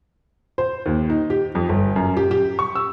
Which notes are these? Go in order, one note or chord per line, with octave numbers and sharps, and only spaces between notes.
C5
D#2
D#4
G4
F2
G1
F#2
G4
G4
C#6
E6